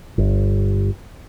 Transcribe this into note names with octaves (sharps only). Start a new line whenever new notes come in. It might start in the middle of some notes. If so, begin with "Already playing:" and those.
G1